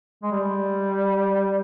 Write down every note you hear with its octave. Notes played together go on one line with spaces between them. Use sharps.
G#3
G3